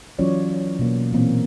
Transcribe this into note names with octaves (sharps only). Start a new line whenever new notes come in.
E3 F#3 C#4 F4 C#5 D5
B2 A#3
A#2 E3 A#3 C4